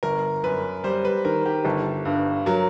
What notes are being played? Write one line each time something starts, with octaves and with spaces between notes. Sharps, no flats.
G1 A#4
F#2 B4
G3 C5
B4
D#3 A#4
G4
G1 A4
G2
F#3 A#4